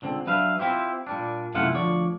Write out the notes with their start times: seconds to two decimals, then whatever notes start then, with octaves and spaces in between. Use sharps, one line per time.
0.02 C#2 D3 C4
0.27 F#3 D4 B4 E5 F5
0.59 C4 E4 F4 G4
1.07 A#2 G3 D4
1.54 F#2 C3 A3 E4 F4 F#5
1.75 D2 F3 C#5 D5